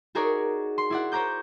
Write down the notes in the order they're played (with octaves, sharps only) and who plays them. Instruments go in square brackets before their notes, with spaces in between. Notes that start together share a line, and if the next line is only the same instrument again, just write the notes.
[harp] D#4 F#4 G#4 A#4 C#5 D5
C6
E4 D5 F#5
C5 C#5 A#5 D6 G6